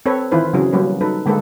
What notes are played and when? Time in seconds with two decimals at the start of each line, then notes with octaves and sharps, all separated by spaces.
0.06 C4 A4 B4 C#5
0.32 D#3 E3 E4 F4 B4 C5
0.53 C#3 F#3 C4 C#4 F#4 G#4
0.73 F#3 G3 A#3 C#4 B4
1.01 D#4 A4 B4
1.26 D3 G#3 A#3 A4 B4